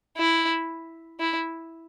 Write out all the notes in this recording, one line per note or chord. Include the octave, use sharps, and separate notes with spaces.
E4
E4